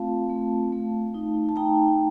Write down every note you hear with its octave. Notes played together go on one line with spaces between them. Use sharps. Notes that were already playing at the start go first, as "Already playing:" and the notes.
Already playing: A3 C4 F4 F5 A5
A3
A3
D#4
A5
D#4 G5 A#5